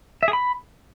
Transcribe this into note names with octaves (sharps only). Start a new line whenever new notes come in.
E5
G#4
B5